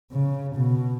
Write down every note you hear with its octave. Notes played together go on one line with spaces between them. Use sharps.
C#3
B2